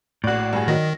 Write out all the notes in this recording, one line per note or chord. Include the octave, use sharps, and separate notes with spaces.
A#1 A2 F#4 D5
G2 G#4
D#3 F#3 D#4 A#6